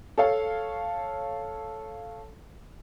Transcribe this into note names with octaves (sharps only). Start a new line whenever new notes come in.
A4 C#5 F5 A5